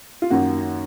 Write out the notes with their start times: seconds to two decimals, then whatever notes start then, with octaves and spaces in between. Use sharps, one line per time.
0.22 F4
0.30 F#2 D#3 A#3 F#4